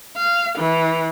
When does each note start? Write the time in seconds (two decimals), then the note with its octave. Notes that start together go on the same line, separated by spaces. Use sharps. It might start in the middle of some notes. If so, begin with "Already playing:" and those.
0.17 F5
0.58 E3